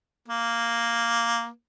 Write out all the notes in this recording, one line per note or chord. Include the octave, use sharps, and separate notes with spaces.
A#3